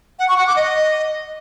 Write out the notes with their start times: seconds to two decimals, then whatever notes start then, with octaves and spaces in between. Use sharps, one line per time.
0.19 F#5
0.28 C#6
0.38 F#5
0.47 D6
0.56 D#5